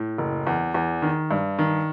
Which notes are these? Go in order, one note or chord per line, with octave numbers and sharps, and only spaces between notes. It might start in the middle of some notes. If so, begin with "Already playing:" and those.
Already playing: A2
F#1
E2
E2
D#3
G2
D#3